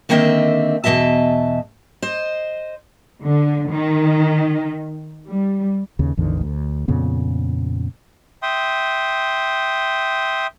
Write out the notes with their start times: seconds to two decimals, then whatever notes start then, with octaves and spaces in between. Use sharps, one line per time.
0.09 D3 D#3 A#3 C4 D#5 E5
0.84 E2 B2 D#3 D#5 E5 A5
2.02 C5 D#5
3.24 D3
3.70 D#3
5.26 G3
5.99 D#2 C#3
6.17 A1 E2 D3 D#3
6.41 D2
6.88 F2 A#2 C#3 B3
8.43 E5 G5 C6 D#6